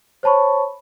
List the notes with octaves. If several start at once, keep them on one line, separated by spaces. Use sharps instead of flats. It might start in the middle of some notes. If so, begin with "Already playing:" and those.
C5 C#5 A5 B5 C#6